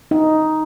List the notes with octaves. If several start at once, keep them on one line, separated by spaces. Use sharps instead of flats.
D#4